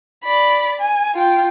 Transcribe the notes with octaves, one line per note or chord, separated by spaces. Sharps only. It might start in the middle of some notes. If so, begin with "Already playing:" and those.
D5 B5
G#5
F4 G5